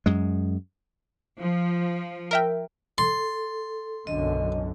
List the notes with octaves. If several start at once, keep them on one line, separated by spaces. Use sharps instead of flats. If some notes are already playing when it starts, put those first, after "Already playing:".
F#2 G#3
F3
A#4 E5 G5
A4 C6
B1 F#2 D3 D#5